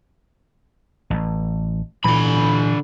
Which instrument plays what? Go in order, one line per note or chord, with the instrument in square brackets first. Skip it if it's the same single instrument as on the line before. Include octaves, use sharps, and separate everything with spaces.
[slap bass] A1
[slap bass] A#2 E3 [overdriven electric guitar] D3 B5